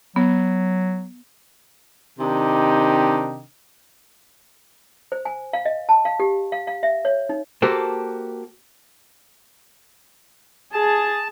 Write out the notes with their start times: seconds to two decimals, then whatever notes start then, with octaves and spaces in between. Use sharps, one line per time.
0.16 F#3 B3
2.19 C3 D#3 D4 D#4 G4
5.12 C5
5.25 G#5
5.53 F5
5.65 D#5
5.89 A5
6.05 F5
6.20 G4
6.52 F5
6.67 F5
6.83 E5
7.05 C#5
7.29 D#4
7.62 A#3 F#4 G4 A4 C5
10.73 G#4 A5